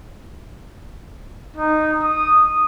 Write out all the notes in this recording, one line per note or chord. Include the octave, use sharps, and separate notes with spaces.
D#4
D#6